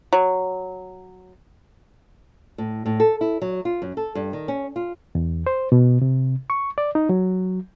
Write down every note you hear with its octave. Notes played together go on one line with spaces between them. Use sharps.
F#3
A2
A2
A4
E4
F#3
F4
F#2
A4
G2
D#3
C#4
F4
E2
C5
B2
C3
C#6
D5
D#4
F#3